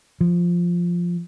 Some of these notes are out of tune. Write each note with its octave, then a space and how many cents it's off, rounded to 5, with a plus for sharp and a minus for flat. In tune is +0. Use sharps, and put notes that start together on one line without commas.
F3 +0